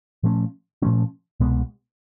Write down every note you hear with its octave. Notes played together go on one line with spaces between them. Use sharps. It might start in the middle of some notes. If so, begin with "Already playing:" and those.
A#2 F3 A3 C#4
A#2 F3 A3 C#4
C2 B2 G#3 B3